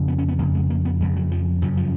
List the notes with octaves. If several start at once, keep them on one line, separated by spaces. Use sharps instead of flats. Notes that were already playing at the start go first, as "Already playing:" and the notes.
Already playing: F2 C#3
B3
C#4
B3
F2 C#3 A#3
G#3
A#3
B3
F2 C#3 G#3
F#3
F3
F#2 C#3 F3
F3